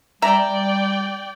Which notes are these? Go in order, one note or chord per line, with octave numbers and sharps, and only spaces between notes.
G3 D5 E5 G5 A#5